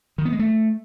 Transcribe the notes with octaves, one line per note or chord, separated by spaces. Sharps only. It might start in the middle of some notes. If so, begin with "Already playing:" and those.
D#3
B3
G#3
A3